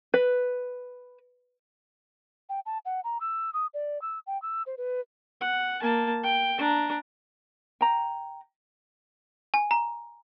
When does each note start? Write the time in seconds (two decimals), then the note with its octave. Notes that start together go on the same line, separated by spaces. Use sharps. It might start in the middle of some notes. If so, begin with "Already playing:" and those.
0.14 B4
2.49 G5
2.66 A5
2.85 F#5
3.04 A#5
3.21 E6
3.53 D#6
3.74 D5
4.02 E6
4.27 G5
4.42 E6
4.66 C5
4.77 B4
5.41 F#5
5.82 A#3 A5
6.23 G5
6.58 D4 A#5
7.81 G5 A#5
9.54 G#5
9.71 A#5